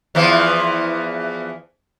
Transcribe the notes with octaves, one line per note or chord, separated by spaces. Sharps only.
E2 E3 F3